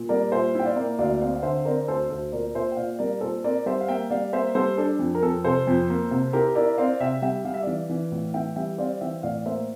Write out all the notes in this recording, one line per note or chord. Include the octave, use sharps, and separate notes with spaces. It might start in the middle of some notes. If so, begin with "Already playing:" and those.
Already playing: A#2
G3 A#4 D5
A#2 C5 E5
E4 G5
D5 F5
A#3
D2 D5 F5
C4 D5 F5
F5
D3 C5 E5
C4 A#4 D5
D2 A4 C5
D2 A4 C5
A#2 A#4 D5
A#2 C5 E5
G5
A#2 D5 F5
G3 A#4 D5
A#2 A4 C5
C4 A#4 D5
G3 C5 E5
F5
A#3 E5 G5
G3 D5 F5
A#3 C5 E5
G3 A4 C5
D4 A4
F2
A#4
F2 A4
C3 A4 C5
F2
A#3
C3
E4 G4 A#4
E4 A#4 D5
C4 D5 F5
C3 E5 G5
G3 E5 G5
G3 F5
E5
E3 D5 F5
E3
A2
E3 E5 G5
G3 E5 G5
C4 D5 F5
E3 E5 G5
A2 D5 F5
A#3 C5 E5